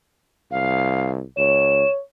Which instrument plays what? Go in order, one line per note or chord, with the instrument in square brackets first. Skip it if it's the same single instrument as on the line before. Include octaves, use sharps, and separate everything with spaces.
[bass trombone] C2 [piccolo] F5
[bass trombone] C#2 [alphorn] C#5 [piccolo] E7